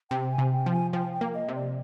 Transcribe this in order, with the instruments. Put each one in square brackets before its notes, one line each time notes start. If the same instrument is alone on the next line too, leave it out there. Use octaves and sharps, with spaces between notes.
[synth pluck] C3 [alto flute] G5
[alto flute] G#5
[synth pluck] C3
[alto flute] G5
[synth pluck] F3
[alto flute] G#5
[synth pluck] F3 [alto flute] G5
[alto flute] G5
[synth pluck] A#3
[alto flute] D#5
[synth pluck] C3
[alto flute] D5